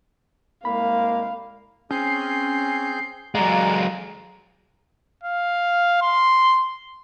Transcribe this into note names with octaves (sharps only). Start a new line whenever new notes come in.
C2 G#3 A#3 F5 B5
C4 C#4 G#4 G6 C7
F#3 G#3 D5 F5 F#5 G#5 A#5
F5
C6